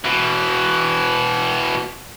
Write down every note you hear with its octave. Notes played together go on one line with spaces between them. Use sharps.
B2 E3